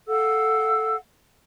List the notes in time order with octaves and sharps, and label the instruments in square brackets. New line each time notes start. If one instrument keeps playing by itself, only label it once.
[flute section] A4 F5 F#5 E6